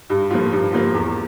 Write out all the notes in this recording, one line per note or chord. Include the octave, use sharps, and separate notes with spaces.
G2
F3 A#3 F4
G2
F3 A#3 F4
E2